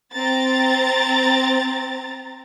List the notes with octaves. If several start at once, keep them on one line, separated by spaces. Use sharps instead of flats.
C4 A#5 A6